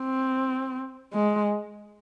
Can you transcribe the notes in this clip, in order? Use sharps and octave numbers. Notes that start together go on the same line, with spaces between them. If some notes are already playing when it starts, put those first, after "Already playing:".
Already playing: C4
G#3